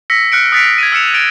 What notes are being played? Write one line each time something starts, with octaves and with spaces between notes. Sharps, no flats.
E6 A#6 B6 C#7
F6 F#6 C#7 D7
D#6 F#6 A6 B6 C#7 D7
G#6 D7 D#7
E6 F6 C#7 E7 F7
A6 D7 G7